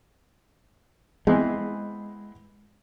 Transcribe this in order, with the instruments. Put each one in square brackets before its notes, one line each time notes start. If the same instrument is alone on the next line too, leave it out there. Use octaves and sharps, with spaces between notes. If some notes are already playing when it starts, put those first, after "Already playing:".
[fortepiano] E3 B3 C4 [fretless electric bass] G#3